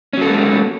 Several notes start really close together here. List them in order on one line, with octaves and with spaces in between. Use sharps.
C#4 F#3 A4 B3 G#3